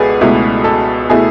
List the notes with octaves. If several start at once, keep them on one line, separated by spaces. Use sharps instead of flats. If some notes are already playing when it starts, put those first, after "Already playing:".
Already playing: C#2 B2 A3 G#4 B4 D5 F#5
C#2 B2 A3 E4
A4
B2 A3 E4 G#4